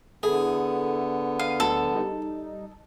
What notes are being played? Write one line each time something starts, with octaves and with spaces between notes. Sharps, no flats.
D3 B3 E4 G#4 A4
F5 D#7
D2 F#3 G#3 A4
G3 D#4